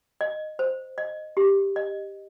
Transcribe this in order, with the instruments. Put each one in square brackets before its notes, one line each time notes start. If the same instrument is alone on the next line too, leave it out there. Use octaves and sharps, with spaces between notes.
[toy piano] D#5
C5
D#5
G4
D#5